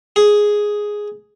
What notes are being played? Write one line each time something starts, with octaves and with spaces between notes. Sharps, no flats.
G#4